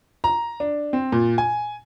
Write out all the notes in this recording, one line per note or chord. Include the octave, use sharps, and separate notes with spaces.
A#5
D4
C4
A#2
G#5